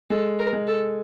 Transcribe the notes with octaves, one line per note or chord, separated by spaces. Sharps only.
G#3 A4
A#4
G#3
A4